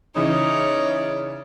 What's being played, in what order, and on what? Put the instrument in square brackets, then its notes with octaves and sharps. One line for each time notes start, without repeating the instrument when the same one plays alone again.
[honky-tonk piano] C#3 E3 E4 [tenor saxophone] D#4 [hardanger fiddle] C#5 D5